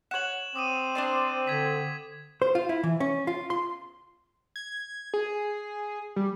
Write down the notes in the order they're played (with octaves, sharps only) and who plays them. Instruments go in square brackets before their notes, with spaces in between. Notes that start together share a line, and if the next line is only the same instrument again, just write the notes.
[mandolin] C#5 F#5 [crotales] E7 F#7
[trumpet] C4 [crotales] D6 D#6 D#7
[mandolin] D4 C5 D5
[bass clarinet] D3 [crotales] G#6 B6
[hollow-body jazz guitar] C5
F4
E4
E3
C#4
F4
C6
[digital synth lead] G#6
G#4
G3